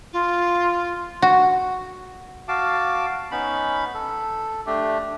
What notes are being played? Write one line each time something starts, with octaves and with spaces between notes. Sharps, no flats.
F4
F#4
F#4 F5 A5 D6
B3 C#4 D#4 B5
A4
A3 D4 G4